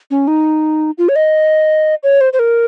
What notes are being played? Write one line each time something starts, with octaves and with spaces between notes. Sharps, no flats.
C#4
D#4
F4
C#5
D#5
C#5
C5
C5
A#4